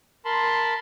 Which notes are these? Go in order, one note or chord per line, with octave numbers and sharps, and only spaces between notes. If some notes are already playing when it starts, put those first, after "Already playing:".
A#4 A5 B5 C6